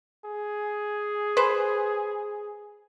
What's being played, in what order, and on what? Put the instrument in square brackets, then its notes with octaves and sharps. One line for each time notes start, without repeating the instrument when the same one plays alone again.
[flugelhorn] G#4
[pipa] B4 C5